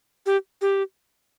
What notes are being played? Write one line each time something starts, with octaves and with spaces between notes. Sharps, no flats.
G4
G4